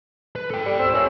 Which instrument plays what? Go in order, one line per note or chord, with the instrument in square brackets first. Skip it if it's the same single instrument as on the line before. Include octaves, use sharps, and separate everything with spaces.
[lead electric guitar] B4
A4 G5
[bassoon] G3
[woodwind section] C#2 G4 E6 [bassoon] C4
[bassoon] C#4 [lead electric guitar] A#4 E5